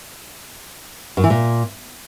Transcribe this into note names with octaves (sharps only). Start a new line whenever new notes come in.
F#2
E3
A#2